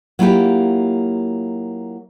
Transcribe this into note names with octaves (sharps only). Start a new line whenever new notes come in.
F#3 A#3 E4 F4 G4